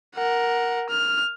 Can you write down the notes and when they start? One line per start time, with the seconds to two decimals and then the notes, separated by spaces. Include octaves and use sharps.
0.16 A#4 F#5
0.89 F6